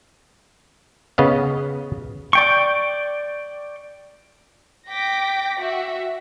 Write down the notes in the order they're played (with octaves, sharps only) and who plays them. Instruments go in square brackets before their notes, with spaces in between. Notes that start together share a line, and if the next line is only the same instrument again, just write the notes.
[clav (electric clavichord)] C#3 B3 D#5 F5
[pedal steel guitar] D5 G5 C#6
[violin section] G5 D6 A#6 B6
F#4 E5